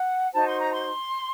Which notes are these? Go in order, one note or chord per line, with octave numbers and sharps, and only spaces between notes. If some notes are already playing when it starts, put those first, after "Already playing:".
Already playing: F#5
D#4 F#4 C5 A5
C6
A#5
C6